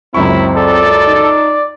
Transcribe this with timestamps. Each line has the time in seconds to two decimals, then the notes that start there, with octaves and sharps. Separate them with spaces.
0.14 C#2 F#2 C4 E4 C#6
0.57 A4 D5
1.08 D#4